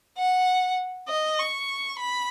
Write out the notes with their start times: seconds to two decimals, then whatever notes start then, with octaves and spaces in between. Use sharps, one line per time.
0.17 F#5
1.09 D#5
1.39 C#6
1.99 B5